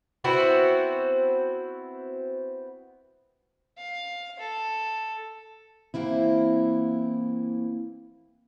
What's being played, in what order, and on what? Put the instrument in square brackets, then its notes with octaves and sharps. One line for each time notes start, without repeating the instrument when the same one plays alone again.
[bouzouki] B3 C4 E4 F#4
[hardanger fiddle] F5
A4
[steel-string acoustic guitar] E3 A#3 C4 E4